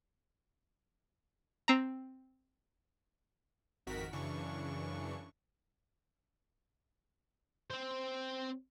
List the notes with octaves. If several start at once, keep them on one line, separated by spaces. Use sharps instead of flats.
C4 A#5
G#1 F2 D#3 F#4 A#4 B6
F#2 C#3 E3 D4 C#6
C4 C5